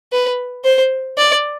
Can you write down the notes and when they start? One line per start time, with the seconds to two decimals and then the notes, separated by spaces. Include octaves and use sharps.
0.12 B4
0.64 C5
1.17 D5